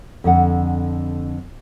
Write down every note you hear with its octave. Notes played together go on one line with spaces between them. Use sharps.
F2 D3 F#5